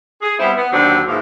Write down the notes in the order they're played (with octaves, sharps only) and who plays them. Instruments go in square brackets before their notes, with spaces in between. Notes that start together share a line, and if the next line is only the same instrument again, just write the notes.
[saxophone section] G#4
G3 B3 C4 E4
B3
D#2 D3 F#3 D4 C5
G#2 E3 F3 A#3 F4